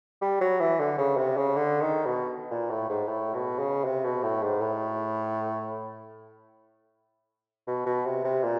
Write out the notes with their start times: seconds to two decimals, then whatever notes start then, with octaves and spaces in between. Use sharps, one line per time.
0.21 G3
0.41 F#3
0.60 E3
0.79 D3
0.98 C#3
1.17 C3
1.36 C#3
1.56 D3
1.81 D#3
2.06 B2
2.51 A#2
2.70 A2
2.89 G#2
3.08 A2
3.34 B2
3.59 C#3
3.85 C3
4.04 B2
4.23 A2
4.42 G#2
4.62 A2
7.67 B2
7.86 B2
8.05 C3
8.24 C3
8.44 A#2